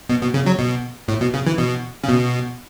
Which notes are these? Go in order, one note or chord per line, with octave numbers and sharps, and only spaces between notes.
B2
B2
C#3
F#3
B2
A2
B2
C#3
E3
B2
C#3
B2